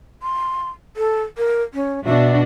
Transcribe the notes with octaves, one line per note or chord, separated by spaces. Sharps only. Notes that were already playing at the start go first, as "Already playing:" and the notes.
C6
A4
A#4
C#4
B2 D4 F#4 E5